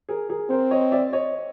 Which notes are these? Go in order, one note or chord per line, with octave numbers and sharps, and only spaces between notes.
G#4 A#4
G#4 A#4
C4 A#4 C5
C#5 D#5
D5 E5
C#5 D#5